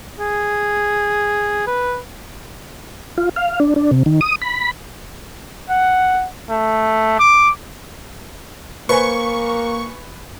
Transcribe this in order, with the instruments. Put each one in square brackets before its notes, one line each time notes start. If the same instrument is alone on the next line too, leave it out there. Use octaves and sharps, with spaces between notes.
[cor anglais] G#4
B4
[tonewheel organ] F4
F5
D4
D4
C3
D#3
D#6
B5
[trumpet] F#5
A3
D6
[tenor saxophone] A#3 [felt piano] B4 C5 G#5 [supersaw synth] C#6